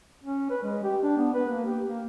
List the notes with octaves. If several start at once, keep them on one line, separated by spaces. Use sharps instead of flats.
C#4
B4
G#3
G4
D4
B3
B4
A#3
G4
A#3